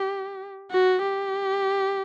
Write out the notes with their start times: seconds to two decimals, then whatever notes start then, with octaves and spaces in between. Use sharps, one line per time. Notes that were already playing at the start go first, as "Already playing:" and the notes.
Already playing: G4
0.71 F#4
1.03 G4